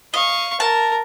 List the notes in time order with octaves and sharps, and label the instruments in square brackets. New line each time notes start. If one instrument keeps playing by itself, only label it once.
[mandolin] D#5 [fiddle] F5 C#6
[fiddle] A#4 [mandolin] A5